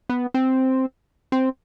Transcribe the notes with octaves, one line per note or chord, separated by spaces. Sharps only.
B3
C4
C4